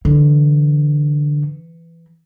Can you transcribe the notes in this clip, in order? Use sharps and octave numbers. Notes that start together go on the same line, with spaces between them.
D3 E3